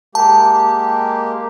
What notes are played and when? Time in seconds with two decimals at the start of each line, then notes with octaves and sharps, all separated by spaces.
0.15 G#3 A#3 G4 A5